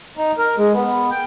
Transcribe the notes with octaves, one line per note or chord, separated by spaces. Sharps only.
D#4
A#4
G#3
B3
G5